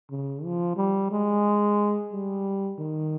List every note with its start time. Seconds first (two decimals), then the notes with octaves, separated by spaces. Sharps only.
0.11 C#3
0.44 F3
0.77 G3
1.11 G#3
2.12 G3
2.78 D#3